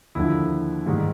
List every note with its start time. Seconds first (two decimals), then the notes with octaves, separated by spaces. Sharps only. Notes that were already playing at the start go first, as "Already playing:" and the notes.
0.15 D#2 D3 F3 E4
0.86 G#2 D#3 G3